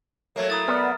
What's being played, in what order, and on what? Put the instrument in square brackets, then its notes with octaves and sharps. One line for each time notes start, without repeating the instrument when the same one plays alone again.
[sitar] F#3 A3 A#3 [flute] C#5
[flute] E4 [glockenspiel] A#5 D#6 A6
[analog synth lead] B3 [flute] D5 [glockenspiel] F6